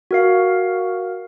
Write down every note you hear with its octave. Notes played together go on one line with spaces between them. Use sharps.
F#4 A#4 F5